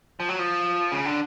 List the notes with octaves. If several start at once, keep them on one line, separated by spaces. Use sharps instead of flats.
F3
F#3
F3
C#3
D3